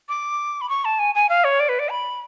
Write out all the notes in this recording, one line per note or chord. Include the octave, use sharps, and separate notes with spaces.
D6
B5
C#6
A5
G#5
G#5
F5
C#5
D5
B4
D5
B5